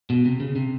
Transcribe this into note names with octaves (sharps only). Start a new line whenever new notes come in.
B2
C3
C#3
C3